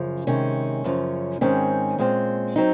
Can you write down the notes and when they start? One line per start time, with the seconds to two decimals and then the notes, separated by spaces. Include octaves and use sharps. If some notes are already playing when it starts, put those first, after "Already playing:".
Already playing: F#2 C#3 F3
0.27 C3 D#3 G#3 C#4
0.84 F#2 C#3 F3
1.41 G#2 D#3 G#3 C4 C#4
1.99 A#2 G#3 C4
2.56 F#3 C4 D#4